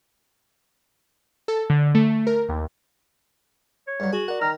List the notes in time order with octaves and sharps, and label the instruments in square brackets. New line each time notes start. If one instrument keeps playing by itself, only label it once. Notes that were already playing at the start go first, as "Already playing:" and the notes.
[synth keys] A4
D3
A3
A#4
D#2
[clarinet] C#5
[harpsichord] G2 F#3
[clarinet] F#4 [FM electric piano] G#4 [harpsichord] G#5
[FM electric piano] A#4 D5 [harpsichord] F#5
[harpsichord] D#3 [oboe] A#5 [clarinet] F6